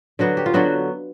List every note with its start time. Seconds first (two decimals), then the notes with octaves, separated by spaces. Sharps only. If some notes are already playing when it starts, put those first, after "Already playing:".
0.19 D3 F#3 B3 F#4
0.37 G4
0.46 F4
0.54 D3 F#3 B3 F#4